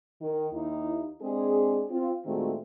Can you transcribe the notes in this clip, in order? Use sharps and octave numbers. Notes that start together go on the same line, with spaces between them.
D#3
D#2 D#4 E4
G#3 C4 D4 G#4
C4 F4
A#2 D#3 G#3 A3 C4 F#4